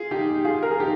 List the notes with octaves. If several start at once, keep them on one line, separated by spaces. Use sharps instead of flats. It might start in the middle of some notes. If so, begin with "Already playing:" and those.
Already playing: F4 G#4
D#4 G4
F4 G#4
A#4
G#4
D#4 G4